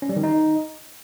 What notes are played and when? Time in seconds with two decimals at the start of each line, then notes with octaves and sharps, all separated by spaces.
0.02 C#4
0.09 G3
0.16 D#3
0.23 D#4